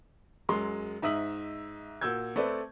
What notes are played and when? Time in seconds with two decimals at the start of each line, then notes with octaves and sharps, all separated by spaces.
0.49 F#2 F#3 G#3 C6
1.02 G#2 D#4 E5 D#6 B6 F#7
2.01 A#2 F#4 E6 G6 G#6
2.36 A3 C4 A4 B4 D5